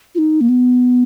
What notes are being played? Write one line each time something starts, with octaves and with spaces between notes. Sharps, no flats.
F4
D#4
A#3
B3